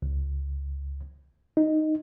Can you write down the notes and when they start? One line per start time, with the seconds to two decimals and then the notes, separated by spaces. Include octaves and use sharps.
0.02 C#2
1.57 D#4